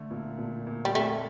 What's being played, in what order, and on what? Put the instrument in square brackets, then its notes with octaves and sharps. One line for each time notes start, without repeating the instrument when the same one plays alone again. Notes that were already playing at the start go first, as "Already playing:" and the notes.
Already playing: [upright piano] D3 A3
A#2
A#2
A#2
[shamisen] G3
[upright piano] F2 [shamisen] A3